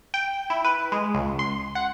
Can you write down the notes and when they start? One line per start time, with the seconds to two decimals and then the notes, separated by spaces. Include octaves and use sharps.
0.14 G5
0.50 E4
0.64 B4
0.92 G#3
1.14 C#2
1.39 C6
1.75 F#5